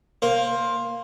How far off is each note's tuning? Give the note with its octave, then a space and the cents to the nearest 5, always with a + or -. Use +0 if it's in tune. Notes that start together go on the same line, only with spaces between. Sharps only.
A#3 +0 C5 +15